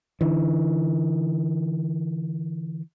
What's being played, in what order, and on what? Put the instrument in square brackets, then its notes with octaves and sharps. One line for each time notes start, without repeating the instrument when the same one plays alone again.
[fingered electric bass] D3 E3